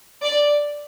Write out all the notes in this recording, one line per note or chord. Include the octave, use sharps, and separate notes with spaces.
D5